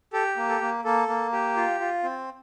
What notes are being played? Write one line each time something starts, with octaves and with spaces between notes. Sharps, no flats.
G4 A4
A#3
A4
A#3
A#3 A4
A#3
G4
F4
F4
C4